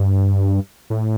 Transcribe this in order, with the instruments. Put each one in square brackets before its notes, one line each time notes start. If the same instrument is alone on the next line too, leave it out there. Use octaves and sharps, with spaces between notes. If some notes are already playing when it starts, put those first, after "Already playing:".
Already playing: [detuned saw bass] G2
A2